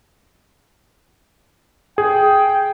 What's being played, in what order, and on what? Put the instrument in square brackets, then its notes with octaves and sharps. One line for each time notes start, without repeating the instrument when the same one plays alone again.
[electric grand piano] G#4 [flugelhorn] G5